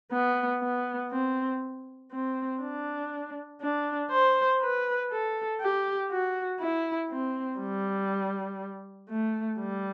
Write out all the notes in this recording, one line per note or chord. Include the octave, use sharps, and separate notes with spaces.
B3
B3
C4
C4
D4
D4
C5
B4
A4
G4
F#4
E4
C4
G3
A3
G3